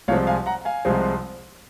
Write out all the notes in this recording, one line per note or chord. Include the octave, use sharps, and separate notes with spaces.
C2 C3 F3 G#3 C4 C#5 F5
F5 G#5
F#5 A#5
F5 G#5
C2 C3 F3 G#3 C4